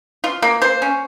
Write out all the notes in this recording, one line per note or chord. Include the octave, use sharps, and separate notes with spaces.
F4
A#3
C5
C#4